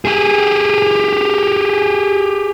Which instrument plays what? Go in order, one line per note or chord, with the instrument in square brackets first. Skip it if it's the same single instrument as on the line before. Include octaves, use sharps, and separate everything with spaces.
[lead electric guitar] G4 G#4